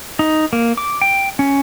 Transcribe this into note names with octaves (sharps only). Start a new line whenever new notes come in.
D#4
A#3
D6
G5
C#4